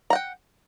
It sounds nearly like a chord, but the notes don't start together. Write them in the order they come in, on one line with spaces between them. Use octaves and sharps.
A#5 F#5 G5